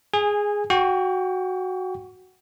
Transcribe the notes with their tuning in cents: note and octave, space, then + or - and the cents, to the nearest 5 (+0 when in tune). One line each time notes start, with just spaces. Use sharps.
G#4 +0 G#5 -20
F#4 +0 G5 +15 C#6 +40